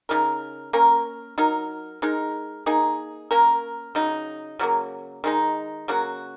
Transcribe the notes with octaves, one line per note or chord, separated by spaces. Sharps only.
C#3 G#3 D#4 A#4
A#3 C#4 A#4
F#3 D#4 A#4
G#3 D#4 A#4
A#3 D#4 G#4
A#3 C#4 A#4
C#3 F#3 D#4
C#3 F#3 A#3
D#3 G#3 D#4
C#3 F#3 A#3 F#4